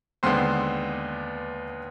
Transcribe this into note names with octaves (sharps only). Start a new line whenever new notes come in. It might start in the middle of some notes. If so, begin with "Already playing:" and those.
D#2 D3 G#3 B3 C5 C6